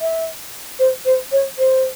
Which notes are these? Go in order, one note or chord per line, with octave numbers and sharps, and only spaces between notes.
E5
C5
C5
C#5
C5